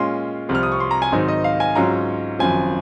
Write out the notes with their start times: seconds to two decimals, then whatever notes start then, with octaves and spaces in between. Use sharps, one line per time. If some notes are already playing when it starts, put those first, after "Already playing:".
Already playing: A#2 G#3 C#4 F4 C6
0.49 C2 C3 F3
0.55 F6
0.63 D#6
0.72 C#6
0.80 C6
0.91 A#5
1.02 G#5
1.12 G#2 D#3 F#3 C4 D#4
1.28 D#5
1.44 F5
1.60 G#5
1.75 G#2 F#3 C#4 F4 A#5
2.39 G#1 F#2 F3 G#5